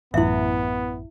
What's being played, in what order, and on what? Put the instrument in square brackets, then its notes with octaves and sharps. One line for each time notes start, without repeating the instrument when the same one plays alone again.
[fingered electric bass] A1 F#2 [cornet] B3 [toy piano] E4 E5